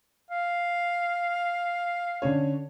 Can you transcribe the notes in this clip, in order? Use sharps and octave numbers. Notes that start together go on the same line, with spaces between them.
F5
D3 C#4 C#5